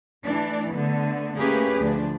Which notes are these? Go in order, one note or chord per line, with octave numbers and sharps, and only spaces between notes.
E3 A3 D4
D3 A3 B3
A3 A#3 C#4 G4 G#4 B4
D2 F3 D4